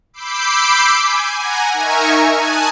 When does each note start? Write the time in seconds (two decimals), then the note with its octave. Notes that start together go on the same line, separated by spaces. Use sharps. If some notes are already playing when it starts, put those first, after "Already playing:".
0.13 B5 D6 E6 G6 C7
0.97 G#5
1.37 F#5 G#5 A#5
1.71 D#4 A#4 E5 G#5 A#5 C#6
2.32 G#5 A5 D#6 F#6